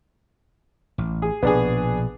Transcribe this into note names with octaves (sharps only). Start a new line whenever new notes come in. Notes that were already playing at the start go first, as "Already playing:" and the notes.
A1
G#4
A#1 B2 B3 D4 G#4